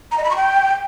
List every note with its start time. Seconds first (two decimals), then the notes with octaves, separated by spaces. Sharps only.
0.12 A#5
0.18 D#5
0.24 B5
0.30 C#6
0.36 G5